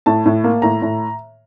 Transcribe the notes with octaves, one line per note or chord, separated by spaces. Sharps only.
A2 A5
A2
A#3
A2 A#5
A2